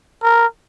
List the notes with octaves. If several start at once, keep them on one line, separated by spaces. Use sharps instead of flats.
A#4